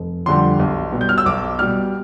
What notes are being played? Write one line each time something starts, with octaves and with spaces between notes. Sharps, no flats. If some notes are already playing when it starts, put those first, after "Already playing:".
Already playing: F1
F2 D3 G3 C6
B1
B2 G3
G6
F6
E6
B1 D6
B2 G3 F6